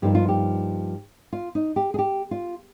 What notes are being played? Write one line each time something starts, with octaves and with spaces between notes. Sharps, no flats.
G2 F3 A#3 D#4 G4
F4
G4
F4
D#4
G4
G#4
G4
F4